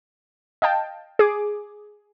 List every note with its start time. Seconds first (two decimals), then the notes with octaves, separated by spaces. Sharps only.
0.62 D#5 F5 G5 A5
1.19 G#4 D6